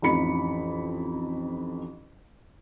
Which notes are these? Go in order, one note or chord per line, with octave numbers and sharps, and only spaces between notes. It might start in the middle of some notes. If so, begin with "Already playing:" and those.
A1 F2 D#4 B5 C#7